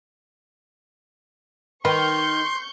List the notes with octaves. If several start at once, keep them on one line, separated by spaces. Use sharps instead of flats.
D#3 B4 C6 C#6 G6